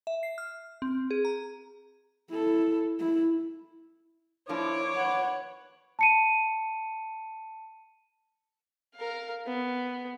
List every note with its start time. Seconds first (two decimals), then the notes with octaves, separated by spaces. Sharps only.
0.07 E5
0.23 C7
0.38 F6
0.82 C4
1.11 G#4
1.25 A#5
2.30 E4 A4
2.99 E4
4.49 F3 A#3 D4 E4 C#5 D6
4.95 B4 F#5
5.99 A5 C#7 D#7
8.95 A#4 F5
9.46 B3